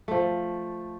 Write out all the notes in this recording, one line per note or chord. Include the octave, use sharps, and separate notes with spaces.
F3 A3